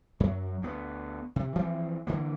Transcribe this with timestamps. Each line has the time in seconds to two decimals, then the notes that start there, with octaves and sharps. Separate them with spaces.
0.20 F#2 F#3
0.62 D2 B3
1.36 C3
1.55 E3 F3 C4
2.07 D3 E3 A#3